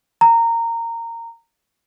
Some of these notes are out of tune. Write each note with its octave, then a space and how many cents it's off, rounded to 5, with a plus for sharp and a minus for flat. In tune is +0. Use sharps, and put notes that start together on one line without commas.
A#5 -15